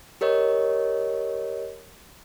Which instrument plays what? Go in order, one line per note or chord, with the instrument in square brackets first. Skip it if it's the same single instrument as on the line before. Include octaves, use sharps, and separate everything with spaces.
[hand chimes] G4 A#4 C#5 D#5